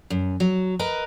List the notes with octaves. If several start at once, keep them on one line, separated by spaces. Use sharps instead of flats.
F#2
F#3
A#4 B4 D#5